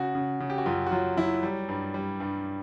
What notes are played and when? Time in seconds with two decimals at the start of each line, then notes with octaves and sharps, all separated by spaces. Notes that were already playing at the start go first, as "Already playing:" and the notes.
Already playing: C#3 F#4
0.15 C#3
0.40 C#3
0.50 G4
0.58 F#4
0.66 F#2 F4
0.87 F#4
0.92 F#3 F4
1.17 F#3 E4
1.43 G3
1.69 G2
1.94 G3
2.20 G2